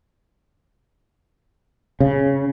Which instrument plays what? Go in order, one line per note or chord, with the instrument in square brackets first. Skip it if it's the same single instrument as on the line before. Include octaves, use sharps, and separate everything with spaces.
[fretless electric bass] C#3